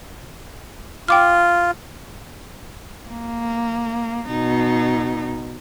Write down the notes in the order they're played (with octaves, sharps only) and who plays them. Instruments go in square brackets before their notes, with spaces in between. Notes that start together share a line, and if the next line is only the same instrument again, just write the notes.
[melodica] F4 [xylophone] G5 D6 F6
[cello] A#3
B2 D#4